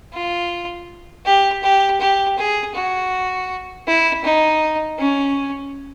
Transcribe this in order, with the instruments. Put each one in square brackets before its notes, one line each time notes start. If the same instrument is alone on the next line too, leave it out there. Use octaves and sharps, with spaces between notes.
[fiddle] F4
G4
G4
G4
G#4
F#4
E4
D#4
C#4